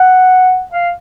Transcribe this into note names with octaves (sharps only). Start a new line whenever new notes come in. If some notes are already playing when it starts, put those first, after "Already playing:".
Already playing: F#5
F5